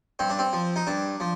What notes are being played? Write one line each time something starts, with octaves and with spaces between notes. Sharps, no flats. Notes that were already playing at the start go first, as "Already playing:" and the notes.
G2 C4
D4
C4
F3
D#4
G2 D4
F3